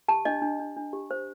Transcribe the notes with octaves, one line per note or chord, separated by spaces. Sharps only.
G4 A5
D4 D#5
D4
D4
D4
G4
C5